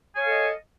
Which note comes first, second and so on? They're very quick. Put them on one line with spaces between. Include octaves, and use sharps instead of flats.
G#5 C#5 F5 A4 D#5